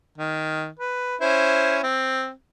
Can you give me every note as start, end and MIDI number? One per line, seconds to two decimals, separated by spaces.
0.18 0.68 51
0.79 1.16 71
1.21 1.80 61
1.21 1.80 64
1.21 1.80 72
1.83 2.31 60